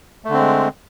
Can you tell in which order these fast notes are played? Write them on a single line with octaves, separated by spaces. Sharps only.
A3 D3 C4 G#3